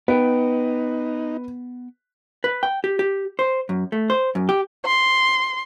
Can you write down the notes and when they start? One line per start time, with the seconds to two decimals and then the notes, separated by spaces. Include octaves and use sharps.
0.08 B3 D#4 B4 G5
2.44 B4
2.63 G5
2.84 G4
2.99 G4
3.39 C5
3.69 F#2
3.92 A3
4.10 C5
4.35 F#2
4.49 G4
4.85 C6